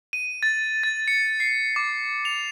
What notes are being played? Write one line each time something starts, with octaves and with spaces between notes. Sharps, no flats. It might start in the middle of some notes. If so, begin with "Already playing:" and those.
D#7
A6
A6
C#7
C7
D6
F7